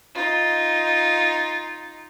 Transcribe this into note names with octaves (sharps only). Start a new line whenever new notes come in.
D#4 F4